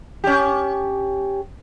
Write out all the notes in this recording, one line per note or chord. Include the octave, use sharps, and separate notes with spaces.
C#4 G4